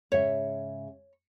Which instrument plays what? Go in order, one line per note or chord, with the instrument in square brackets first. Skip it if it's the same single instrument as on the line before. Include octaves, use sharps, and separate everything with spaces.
[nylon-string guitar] G#2 C#3 E5 [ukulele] C#5